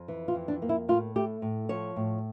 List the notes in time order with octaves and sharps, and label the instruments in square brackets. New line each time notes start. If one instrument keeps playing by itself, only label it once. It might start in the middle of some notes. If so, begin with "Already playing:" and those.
Already playing: [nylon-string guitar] F2
E3
F4
F2
D4
A#3
E4
A2 F4
A3 G4
A2
F3 C#5
A2